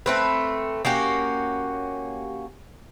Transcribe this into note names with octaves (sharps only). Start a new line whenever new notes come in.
A3 C4 B4
A#3 C#4 F#4 G4